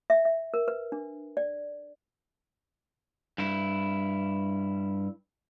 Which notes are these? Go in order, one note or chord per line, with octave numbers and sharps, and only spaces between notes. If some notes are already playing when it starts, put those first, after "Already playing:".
E5
E5
A#4
B4
D4
D5
G2 E4